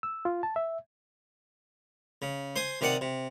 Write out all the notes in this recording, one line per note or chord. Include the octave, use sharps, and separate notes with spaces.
E6
F4
A5
E5
C#3
C5 G#5 D#6
C3 D#3 D5 F#5 D#6
C3